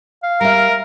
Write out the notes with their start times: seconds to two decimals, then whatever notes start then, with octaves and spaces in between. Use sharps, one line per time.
0.23 F5
0.41 G3 A#4 E5